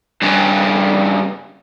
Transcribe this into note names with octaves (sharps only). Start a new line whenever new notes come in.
G2 C#3